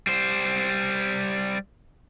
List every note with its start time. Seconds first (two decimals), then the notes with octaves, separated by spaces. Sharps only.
0.07 G3 C5